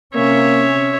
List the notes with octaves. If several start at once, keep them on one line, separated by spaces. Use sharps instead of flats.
C3 A#3 C#4 C#5 E5